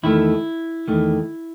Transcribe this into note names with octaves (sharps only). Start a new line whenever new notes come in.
E2 D#3 A3 E4
E2 D#3 A3